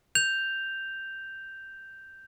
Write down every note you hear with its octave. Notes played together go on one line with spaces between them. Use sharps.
G6 F7